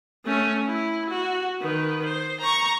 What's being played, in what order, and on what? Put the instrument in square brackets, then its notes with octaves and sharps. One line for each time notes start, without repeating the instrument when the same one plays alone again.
[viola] A3 C#4
E4
F#4
D#3 B4
C5
A#5 C#6